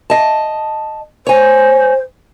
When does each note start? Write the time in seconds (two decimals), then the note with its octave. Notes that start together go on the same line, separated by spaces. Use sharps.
0.10 D#5 A5
1.27 C5 C#5 G#5